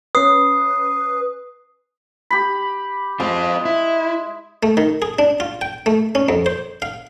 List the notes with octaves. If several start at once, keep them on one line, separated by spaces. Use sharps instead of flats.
C#4 B4 D#6 C7
G4 B5
G#3 C4 F4
E4
A3
D#3
G#4
D4
F4
G5
A3
C#4
F2
C5
F5